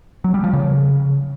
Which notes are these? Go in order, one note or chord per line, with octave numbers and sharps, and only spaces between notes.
F#3
G3
F3
C#3